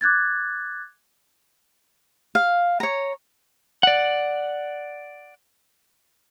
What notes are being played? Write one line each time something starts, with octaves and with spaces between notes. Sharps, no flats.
D6 F#6 G#6 A6
F5
C#5 A#5
D5 F#5